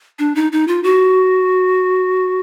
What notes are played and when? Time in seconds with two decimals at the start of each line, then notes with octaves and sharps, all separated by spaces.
0.19 D4
0.36 D#4
0.52 D#4
0.68 F4
0.84 F#4